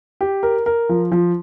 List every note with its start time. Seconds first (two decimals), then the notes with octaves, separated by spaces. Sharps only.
0.21 G4
0.43 A#4
0.66 A#4
0.89 F3
1.11 F3